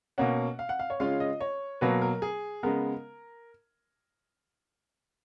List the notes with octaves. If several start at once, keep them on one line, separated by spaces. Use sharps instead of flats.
B2 A#3 C#4 F#5
F5
F#5
F5
C#5
C#3 G#3 C#4 F4 F5
D#5
C#5
B2 F#3 A#3 B4
A#4
G#4
C#3 G#3 B3 A#4